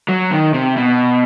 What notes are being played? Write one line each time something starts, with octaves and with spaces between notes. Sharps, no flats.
F#3
D#3
C3
B2